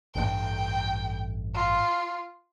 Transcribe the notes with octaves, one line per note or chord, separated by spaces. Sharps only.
A1 G2 A3 G5
F4